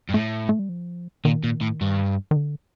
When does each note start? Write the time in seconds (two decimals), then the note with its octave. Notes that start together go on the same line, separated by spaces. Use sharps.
0.09 G2
0.14 A2 A3
0.49 A3
0.59 G3
0.69 F3
1.25 A#2 D#3
1.44 A#2
1.61 A2
1.81 G2
2.31 D#3
2.36 D3